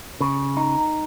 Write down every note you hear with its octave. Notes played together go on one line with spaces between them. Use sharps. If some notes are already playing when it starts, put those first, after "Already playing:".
C#3
D#4